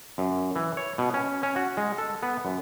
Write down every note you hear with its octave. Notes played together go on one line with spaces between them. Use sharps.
F#2
E3
C#5
B2
C#4
C#4
F#4
G#3
A4
B3
F#2